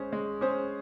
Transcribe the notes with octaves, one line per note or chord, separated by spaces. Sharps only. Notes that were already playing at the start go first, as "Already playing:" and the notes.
Already playing: G#3 C#4 G#4 C5
G#3
C#4 G#4 C5